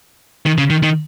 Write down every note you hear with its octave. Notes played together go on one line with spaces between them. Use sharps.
D#3
C#3
D#3
D#3